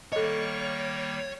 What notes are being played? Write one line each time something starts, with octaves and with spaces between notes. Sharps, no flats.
D#3 G3 A#3 A4 C#5 D#5